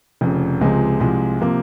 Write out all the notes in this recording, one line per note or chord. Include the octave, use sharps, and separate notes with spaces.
F1 F2 C#3
C#2 C3 F3 G#3
C2 C3 F3 G#3
C3 F3 A#3